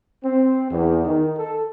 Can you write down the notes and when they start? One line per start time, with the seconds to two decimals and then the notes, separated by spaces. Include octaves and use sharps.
0.25 C4
0.71 E2
1.05 D#3
1.38 A4